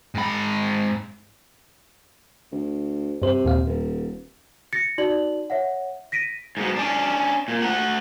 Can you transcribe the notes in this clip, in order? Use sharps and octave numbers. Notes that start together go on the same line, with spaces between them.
G#2 B5
D2
G2 C3 C5
D#2 A#2 F5
D#1
A6 A#6 C#7
D#4 F#4 D5 F#7
C#5 E5 F#5
A#6 B6 D7 D#7
G#2 B2
C#4 D4
A#2
A3 F#5